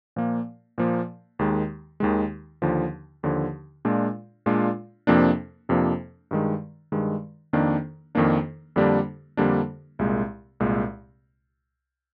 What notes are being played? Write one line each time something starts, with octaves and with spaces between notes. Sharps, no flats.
A#2 F3 A#3
A#2 F3 A#3
D#2 D#3 G#3
D#2 D#3 G#3
D#2 D3 F3
D#2 D3 F3
A#2 G#3 D4 F4
A#2 G#3 D4 F4
F2 C3 F3 A#3 D4
F2 C3 F3 A#3 D4
G2 D#3 G#3
G2 D#3 G#3
F2 D#3 A#3 D4
F2 D#3 A#3 D4
F2 D3 G3 A#3 D4
F2 D3 G3 A#3 D4
C2 A#2 G#3
C2 A#2 G#3